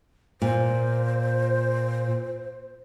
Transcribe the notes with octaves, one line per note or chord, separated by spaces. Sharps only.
A#2 C5